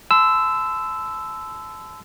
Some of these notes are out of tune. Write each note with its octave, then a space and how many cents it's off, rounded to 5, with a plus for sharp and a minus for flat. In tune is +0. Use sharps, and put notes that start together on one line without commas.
A5 -35 C6 -35 E6 +0